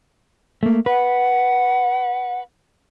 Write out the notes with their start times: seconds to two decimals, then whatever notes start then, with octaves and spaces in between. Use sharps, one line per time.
0.63 A3 A#3
0.86 B4 F#5